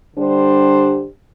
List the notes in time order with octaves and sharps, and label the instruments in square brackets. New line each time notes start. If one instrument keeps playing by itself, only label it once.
[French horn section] D3 G3 D4 G4 C5